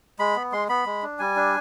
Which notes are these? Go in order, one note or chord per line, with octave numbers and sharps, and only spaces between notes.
G#3 B5
B3
G#3 C6
B3 B5
G#3
D4
G3 G#5
D4